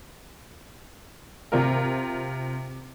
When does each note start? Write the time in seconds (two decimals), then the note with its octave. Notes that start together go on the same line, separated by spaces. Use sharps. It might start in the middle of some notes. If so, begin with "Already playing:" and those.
1.52 C3 F4 A#4